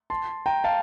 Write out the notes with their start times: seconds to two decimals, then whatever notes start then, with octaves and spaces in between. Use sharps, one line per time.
0.10 A5 C6
0.46 G5 A#5
0.64 F5 A5